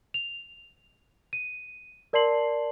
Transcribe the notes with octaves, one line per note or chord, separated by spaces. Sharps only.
F7
D#7
A#4 D5 A5 C6 C7 F#7